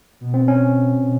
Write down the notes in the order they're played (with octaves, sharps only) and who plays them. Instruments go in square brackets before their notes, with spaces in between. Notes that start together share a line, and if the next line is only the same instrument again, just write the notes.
[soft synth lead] B2
[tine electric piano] C4
C#4
[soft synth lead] B2